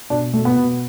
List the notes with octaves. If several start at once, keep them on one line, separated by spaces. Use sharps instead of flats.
B2 D4
B2 A3
B3
B2